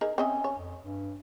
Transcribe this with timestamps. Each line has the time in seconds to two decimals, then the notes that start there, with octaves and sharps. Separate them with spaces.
0.01 D#4 G#4 A#4
0.18 C4 C#4 D#5 E5
0.44 C#5
0.58 F2
0.82 G2